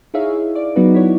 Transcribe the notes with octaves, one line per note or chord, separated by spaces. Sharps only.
D#4 E4 G#4 C#5 E5 F5
D5 D6
F#3 B3 D#4 F#4 B4
E4 C#5